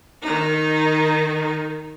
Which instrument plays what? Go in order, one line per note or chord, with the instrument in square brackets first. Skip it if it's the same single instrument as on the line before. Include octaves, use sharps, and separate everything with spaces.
[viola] D#3 D#4